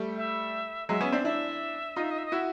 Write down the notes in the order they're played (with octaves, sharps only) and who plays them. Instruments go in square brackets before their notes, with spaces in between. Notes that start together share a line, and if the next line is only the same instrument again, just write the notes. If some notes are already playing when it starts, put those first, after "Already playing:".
Already playing: [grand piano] G3 A3
[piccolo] E5
[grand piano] F#3 G#3 [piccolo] E5
[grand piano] B3 C#4
C4 D4
[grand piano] D4 E4 [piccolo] E5
[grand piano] D#4 F4 [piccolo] D#5
[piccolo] E5
D#5
E5
D#5
[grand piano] E4 F#4 [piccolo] E5